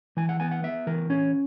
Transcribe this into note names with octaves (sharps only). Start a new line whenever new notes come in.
E3 G#5
F#5
B3 G#5
F#5
B3 E5
E3 A#4
C#4 C#5